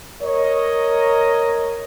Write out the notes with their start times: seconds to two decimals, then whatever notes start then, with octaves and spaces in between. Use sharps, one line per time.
0.22 A#4 C#5 D#5